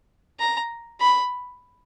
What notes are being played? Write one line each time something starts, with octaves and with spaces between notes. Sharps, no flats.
A#5
B5